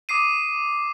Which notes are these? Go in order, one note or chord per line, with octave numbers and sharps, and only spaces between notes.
D6 D#6 C7 D#7